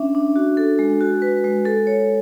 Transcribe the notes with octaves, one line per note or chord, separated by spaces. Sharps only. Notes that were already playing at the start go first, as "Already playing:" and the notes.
Already playing: C#4 D4 E5
D4
F#4
A4
G#3
F#4
B4
G#3
A4
C#5